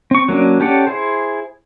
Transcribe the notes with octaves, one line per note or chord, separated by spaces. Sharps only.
C4 C#6
F#3 A#3 C#4 D4
C#4 G4 A4 D5 F#5
E4 G#4 C5